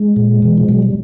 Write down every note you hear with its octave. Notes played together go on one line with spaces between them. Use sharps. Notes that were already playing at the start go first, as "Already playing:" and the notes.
Already playing: G#3
A#2
B2 E3
F3
B2 F#3
G3